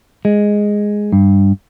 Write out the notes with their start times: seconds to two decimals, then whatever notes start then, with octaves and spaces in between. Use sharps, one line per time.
0.25 G#3
1.12 G2